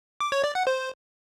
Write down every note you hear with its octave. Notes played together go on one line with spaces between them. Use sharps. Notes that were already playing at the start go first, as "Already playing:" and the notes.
D6
C#5
D5
F#5
C5